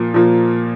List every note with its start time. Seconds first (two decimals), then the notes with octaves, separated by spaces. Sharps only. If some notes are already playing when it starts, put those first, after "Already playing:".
Already playing: A#2 F3 A#3
0.14 A#2 F3 A#3